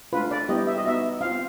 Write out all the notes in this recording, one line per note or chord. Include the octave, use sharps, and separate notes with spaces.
A3 D4 F4 B4
D5
G3 B3 E4 G4 D#5
E5
D#5
B3 D#4 F#4 E5
C4 F4 F5